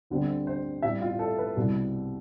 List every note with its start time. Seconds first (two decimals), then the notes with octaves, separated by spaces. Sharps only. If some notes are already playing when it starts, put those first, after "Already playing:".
0.10 D2 D3 G3 C4
0.47 C5
0.82 A2 G3 C4 E5
1.02 F4
1.19 A4
1.38 B4
1.56 C2 B2 G3 C4